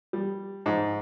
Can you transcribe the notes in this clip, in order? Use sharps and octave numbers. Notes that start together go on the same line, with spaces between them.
G3
G#2